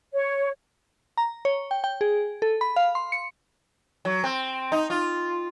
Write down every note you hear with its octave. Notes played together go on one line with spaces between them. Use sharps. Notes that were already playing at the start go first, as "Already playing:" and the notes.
C#5
A#5
C#5
G5
G5
G#4
A4
B5
F5
C6
C#7
F#3
C4
D#4
F4